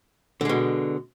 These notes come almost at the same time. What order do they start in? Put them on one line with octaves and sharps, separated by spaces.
D3 G#3 B2